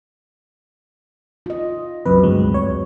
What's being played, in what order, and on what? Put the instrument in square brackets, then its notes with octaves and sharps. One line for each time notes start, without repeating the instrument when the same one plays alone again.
[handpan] F4 D#5
[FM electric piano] C2 F#2 B4 [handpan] F#3 C4
[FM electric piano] D2 G2 G#3
C#5